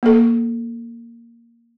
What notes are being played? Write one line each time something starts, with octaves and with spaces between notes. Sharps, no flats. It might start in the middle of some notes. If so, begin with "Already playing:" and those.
A#3 A4